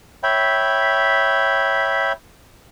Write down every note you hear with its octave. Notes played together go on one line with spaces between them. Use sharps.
C#5 E5 G5 B5